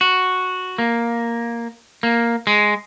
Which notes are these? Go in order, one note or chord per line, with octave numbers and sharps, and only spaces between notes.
F#4
A#3
A#3
G#3